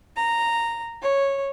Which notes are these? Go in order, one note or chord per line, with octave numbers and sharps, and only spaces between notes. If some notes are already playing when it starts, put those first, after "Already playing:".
A#5
C#5